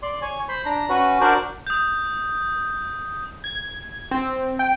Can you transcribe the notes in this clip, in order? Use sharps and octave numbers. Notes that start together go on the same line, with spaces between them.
D5 C6
C#5 G#5
C5 B5 C6
D4 A#5
C#4 F#4 B4
D4 F#4 A#4 C5 D5
D#6 G6
G#6
C4
G5